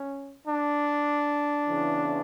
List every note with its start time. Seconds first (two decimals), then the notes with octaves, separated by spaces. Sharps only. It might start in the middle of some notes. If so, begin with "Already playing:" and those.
Already playing: C#4
0.46 D4
1.67 E2 C#3 E3